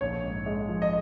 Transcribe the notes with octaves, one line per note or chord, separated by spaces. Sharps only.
A#1 C#5
G#2
G#3
F3
D#5